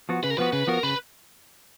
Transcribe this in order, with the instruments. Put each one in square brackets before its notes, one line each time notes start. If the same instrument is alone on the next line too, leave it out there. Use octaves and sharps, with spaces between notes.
[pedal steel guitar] F3 B3 F#4
[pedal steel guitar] C#3 [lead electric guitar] B4
[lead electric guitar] A#4
[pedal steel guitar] F3 B3 F#4 [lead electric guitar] B4
[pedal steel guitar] C#3 [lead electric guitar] B4
[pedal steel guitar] F3 B3 F#4 [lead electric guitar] A#4
[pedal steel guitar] C#3 [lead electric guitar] B4